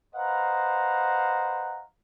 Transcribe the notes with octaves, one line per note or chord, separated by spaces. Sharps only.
B4 C5 D#5 F5 F#5 A#5